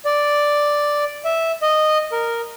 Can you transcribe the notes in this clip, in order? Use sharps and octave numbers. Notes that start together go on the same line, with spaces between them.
D5
E5
D#5
A#4